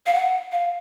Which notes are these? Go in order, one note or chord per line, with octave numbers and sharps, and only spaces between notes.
F5
F#5
F5